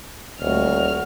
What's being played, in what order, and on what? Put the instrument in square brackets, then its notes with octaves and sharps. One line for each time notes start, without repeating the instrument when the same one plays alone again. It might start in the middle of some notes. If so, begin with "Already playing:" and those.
[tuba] D#1 [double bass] D2 [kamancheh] F#4 F6